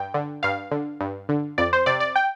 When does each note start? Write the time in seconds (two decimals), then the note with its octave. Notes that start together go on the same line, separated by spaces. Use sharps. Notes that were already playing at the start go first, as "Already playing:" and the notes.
Already playing: G2 G5
0.14 D3
0.43 G2 F5
0.71 D3
1.00 G2
1.29 D3
1.58 F2 D5
1.73 C5
1.86 C3 D5
2.00 D5
2.16 G5